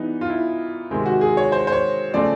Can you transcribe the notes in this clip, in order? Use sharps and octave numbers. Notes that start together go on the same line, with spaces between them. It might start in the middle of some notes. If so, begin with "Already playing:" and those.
Already playing: E3 G3 B3 D#4
F4
E4
C3 D#3 G#3 C4
F#4
G#4
C#5
C5
C5
C#5
C#3 F3 A3 C4 D5